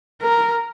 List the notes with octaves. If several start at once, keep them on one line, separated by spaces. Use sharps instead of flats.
A#4